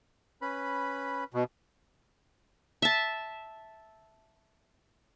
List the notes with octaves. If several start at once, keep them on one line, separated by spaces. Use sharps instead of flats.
C#4 B4 B5
B2 F#4
E5 A5